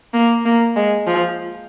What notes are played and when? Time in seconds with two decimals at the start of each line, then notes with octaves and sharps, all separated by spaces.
0.14 A#3
0.45 A#3
0.76 G#3
1.07 F3